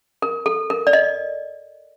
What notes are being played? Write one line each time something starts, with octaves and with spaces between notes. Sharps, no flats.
A#4
A4
A#4
D5
D#5